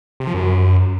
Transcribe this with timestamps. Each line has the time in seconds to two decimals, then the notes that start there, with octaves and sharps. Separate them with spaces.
0.20 C3
0.27 F3
0.34 F#2